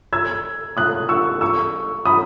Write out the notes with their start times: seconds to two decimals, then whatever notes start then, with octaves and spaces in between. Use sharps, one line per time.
0.13 E6 G#6
0.77 D#6 F#6
1.09 C#6 E6
1.41 C#6 E6
2.05 B5 D#6